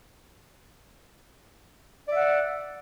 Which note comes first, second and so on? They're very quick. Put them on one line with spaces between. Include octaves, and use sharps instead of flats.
D5 E5 F#5